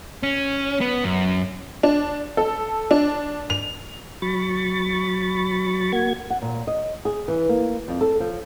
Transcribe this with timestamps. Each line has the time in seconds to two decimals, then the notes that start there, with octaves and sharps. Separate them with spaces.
0.23 C#4
0.81 B3
1.04 F#2
1.83 D4
2.37 A4
2.91 D4
3.50 F7
4.22 F#3 B5 C#6 A6
5.92 A#3 F#4 G#6
6.30 F#5
6.42 A#2
6.67 D#5
7.05 G#4
7.28 E3
7.49 A#3
7.88 F2
8.01 A4
8.20 F3